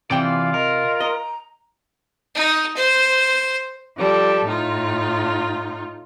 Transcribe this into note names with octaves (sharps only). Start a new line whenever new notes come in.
C3 E3 F4 D5 F5 G5
A#4 D#5
D#5 A#5
D#4
C5
F3 G3 A4
A2 D#4 F4